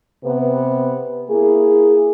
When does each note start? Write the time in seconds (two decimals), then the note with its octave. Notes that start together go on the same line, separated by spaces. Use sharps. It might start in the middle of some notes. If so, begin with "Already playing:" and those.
0.24 C3 B3 B4
1.30 A#3 E4 G#4